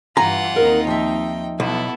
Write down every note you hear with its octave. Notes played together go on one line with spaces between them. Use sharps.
G2 E3 F4 F#5 G#5 A#5
D#2 C4 D#4 A#4
F3 E5 G5
B1 B2 B3 E4 A4